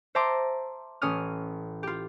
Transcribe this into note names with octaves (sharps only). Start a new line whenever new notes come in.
C5 E5 A5 A#5 C6 D6
A1 C#4 D#6 F6
F4 G4